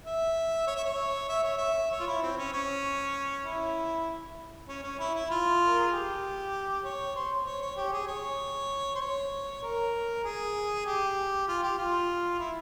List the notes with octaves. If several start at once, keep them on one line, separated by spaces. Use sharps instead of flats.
E5
C#5
E5
C#5
E5
C#5
E5
C#5
F4
E4
C4
C#4
C#4
E4
C#4
C#4
E4
E4
F4
A#4
G#4
G4
C#5
C5
C#5
C#5
G4
G#4
C#5
C5
C#5
A#4
G#4
G4
F4
G4
F4
E4